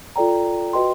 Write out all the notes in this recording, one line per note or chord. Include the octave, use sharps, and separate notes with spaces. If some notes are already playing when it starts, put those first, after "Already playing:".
F4 A4 D5 G5 A#5
F#4 B4 D#5 G5 C6